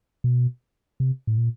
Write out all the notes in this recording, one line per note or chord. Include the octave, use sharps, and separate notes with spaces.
B2
C3
A2
A#2